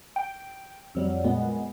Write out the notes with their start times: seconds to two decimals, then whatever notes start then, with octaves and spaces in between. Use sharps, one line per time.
0.16 G5
0.95 F2 F#3 G3
1.24 A#2 G#3 B3